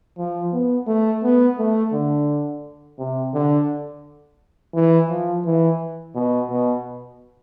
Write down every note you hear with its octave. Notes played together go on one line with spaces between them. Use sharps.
F3
B3
A3
B3
A3
D3
C3
D3
E3
F3
E3
B2
B2